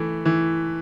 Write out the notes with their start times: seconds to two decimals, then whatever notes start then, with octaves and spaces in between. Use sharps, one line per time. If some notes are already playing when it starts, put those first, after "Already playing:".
Already playing: E3 A3
0.25 E3